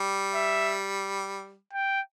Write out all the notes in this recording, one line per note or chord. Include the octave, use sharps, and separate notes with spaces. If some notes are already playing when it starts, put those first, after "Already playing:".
Already playing: G3
E5
G5